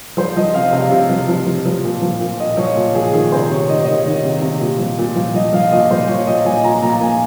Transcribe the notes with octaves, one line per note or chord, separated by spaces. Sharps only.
F3 C5
F3 D#5
C3 F5
C3 F5
C3
F3
F3
F3
F3
A#2
F3
A#2
A#2 D#5
F3 C#5
A#2
A#2 G#4
D#3 G#4
C3 C5
C3 C#5
D#3 D#5
C#5
D#3 D#5
D#3
C3
C3
A#2
F3
A#2
F3
F3 D#5
F3 F5
A#2 D#5
F3 C5
F3 C#5
A#2 D#5
F3 G#5
A#2 A#5
A#2 A#5
A#2 G#5